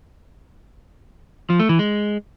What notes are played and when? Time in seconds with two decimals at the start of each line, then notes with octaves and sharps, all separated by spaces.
1.50 F3
1.59 A3
1.69 E3
1.79 G#3